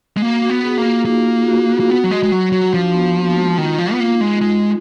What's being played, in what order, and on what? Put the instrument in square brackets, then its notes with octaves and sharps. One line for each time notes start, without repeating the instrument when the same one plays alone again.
[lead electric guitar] G#3
[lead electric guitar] A#3 [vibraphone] F#4
[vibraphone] F#4
[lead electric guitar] B3
[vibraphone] G#4
[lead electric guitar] A#3
[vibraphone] F4
[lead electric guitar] A#3 [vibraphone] D#4
[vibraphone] F4
F#4
F#4
[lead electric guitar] A#3
B3
F#3
G#3
G#3
F#3
F#3
[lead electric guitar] F3 [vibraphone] D4
[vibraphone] B3
A#3
G#3
[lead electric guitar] D#3 [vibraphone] F4
[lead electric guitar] F3
[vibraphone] F4
[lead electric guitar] B3
A#3
[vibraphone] D#4
[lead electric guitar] G#3
G#3